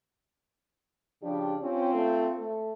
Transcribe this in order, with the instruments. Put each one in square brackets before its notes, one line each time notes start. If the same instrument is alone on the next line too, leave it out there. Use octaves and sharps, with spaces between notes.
[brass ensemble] C#3 F3 G4 [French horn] D4
[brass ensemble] C4 F4 [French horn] C#4
[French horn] A3
A3